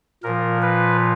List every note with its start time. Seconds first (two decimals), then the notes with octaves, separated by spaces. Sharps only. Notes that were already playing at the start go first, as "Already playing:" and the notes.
0.23 A#2 F3 A#4
0.62 B4